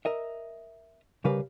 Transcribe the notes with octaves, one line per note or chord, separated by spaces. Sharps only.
A#4 D#5 E5
C2 C#3 G3 A#4 B4 F5